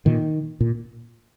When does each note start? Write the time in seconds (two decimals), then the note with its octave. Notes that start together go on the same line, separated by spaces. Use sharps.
0.06 A#2 D#3
0.61 A#2